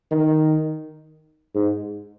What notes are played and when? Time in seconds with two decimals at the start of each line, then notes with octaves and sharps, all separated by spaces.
0.11 D#3
1.55 G#2